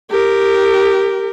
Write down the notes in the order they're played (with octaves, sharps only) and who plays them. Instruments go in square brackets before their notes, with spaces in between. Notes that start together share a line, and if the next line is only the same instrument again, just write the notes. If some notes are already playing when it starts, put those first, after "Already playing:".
[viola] G4 A#4